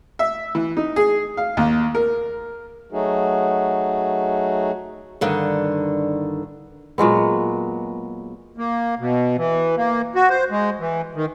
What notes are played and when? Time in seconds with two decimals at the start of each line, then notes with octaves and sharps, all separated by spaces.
0.19 E5
0.55 E3
0.77 D#4
0.96 G#4
1.37 F5
1.57 D#2
1.95 A#4
2.92 F#3 A3 D#4 F#4 G#4
5.21 G2 D3 D#3
6.98 A#2 F#3 G#3 B3
8.58 A#3
8.99 B2
9.37 E3
9.77 A#3
10.15 F#4
10.30 C5
10.51 G#3
10.80 E3
11.15 D#3